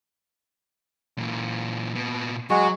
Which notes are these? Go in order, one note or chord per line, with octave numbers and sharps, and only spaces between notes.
A#2 E3
A#2 B3
F#3 G#3 F#4